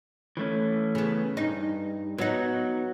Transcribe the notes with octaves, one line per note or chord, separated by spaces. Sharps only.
E3 A3 C#4
C#3 B3
G2 D#4
F#3 B3 D#4 F#4